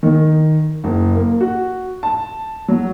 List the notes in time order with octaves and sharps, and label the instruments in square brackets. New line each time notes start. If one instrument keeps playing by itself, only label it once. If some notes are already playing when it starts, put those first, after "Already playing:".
[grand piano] D#3
F#1
A#3
F#4
A5
F#3